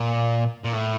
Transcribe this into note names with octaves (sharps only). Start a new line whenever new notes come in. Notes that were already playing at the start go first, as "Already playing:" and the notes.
Already playing: A#2
A#2
A2